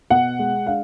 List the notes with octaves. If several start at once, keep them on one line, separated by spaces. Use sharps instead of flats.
B2 F#5
G#3
D4 F5